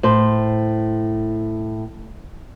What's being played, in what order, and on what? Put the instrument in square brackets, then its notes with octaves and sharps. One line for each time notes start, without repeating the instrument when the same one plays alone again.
[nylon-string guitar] A2 C5